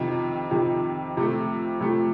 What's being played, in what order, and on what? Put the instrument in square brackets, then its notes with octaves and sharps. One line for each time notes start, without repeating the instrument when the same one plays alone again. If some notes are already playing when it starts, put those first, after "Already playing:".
Already playing: [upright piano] F2 C3 D#3
F2 C3 D#3
F2 C3 F3 A3
F2 C3 F3 A3